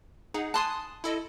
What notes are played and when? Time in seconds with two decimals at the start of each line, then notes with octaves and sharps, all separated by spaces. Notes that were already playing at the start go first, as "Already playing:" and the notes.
0.34 D#4 G#4 F#5
0.54 G#5 A5 C6 D#6 F#6
1.04 E4 A4 D#5